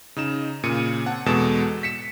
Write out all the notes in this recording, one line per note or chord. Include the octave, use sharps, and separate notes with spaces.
C#3 D#4 E7
A#2 C#3 C#7 D#7
C4 F#5 A5
E2 B2 G#3 A4 E7
B6 C#7 E7